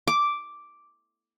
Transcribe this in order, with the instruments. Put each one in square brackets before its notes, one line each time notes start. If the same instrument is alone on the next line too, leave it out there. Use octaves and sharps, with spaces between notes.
[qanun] D6